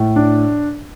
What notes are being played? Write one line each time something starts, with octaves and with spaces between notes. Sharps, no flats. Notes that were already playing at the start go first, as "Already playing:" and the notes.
Already playing: A2
D4